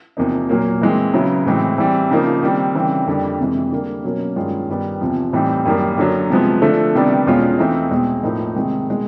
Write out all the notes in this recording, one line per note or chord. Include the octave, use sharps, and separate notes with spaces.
E2 C3 F3 A#3 D#4
A#2 F#3 A#3
E3 G#3 C4
C#3 F#3 B3 E4
A2 E3 G#3 C4
E3 G3 C4
C#3 F3 A#3 D#4
D#3 G3 C4
C#3 E3 G3 C4
F2 D3 G3 A#3 D4
F2 C3 E3 G#3
D3 G3 A#3
B2 F#3 A#3 C#4
G2 D#3 G#3 C#4 F4
G2 D#3 G3 B3
E2 C3 F3
A2 E3 G3 C4 D#4
F#2 D#3 G3 A#3
F#2 D3 F#3
C3 F3 G#3 B3
D3 F3 A3
C3 D#3 G3 B3 D4
E2 B2 G#3 C#4 F4
E3 A3 C4 D#4
E2 B2 G#3 C4
A2 F3 A#3 D#4
C3 D#3 G#3 C4
B2 G#3